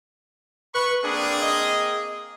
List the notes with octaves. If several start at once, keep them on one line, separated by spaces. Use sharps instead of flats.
B4 B5 C#6
A#3 C4 D4 G#4
D#5